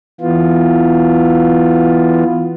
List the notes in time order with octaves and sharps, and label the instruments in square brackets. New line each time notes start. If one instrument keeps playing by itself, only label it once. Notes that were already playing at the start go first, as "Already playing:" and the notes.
[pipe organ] E3 B3 F4